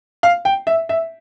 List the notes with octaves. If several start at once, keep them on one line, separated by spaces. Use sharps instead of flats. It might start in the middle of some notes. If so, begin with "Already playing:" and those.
F5
G5
E5
E5